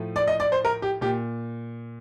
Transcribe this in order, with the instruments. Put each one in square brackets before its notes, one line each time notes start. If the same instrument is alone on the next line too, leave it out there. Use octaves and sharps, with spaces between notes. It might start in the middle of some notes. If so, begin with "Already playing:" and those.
Already playing: [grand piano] A2 F3 A3
D5
D#5
D5
C5
A#4
G4
A#2 G4